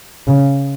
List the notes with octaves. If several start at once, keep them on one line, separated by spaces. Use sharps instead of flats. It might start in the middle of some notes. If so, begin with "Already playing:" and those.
C#3